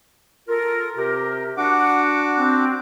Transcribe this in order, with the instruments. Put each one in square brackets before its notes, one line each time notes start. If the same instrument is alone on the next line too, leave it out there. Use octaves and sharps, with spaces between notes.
[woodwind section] F4 A4 A#4
[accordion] C3 [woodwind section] G4 A#4
[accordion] D4 F#4 D6 [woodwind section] F#5
[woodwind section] C4